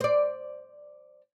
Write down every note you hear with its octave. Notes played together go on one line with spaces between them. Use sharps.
C5 D5